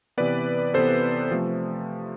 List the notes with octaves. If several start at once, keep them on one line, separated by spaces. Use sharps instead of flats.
C3 E3 B3 B4 D5
C3 E3 B3 A4 C5
C3 F3 A3